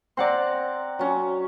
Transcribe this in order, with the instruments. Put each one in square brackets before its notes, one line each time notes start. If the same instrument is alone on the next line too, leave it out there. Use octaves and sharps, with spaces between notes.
[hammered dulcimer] C4 A#5 [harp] D5 F#5 C6
[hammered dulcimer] F#3 C#4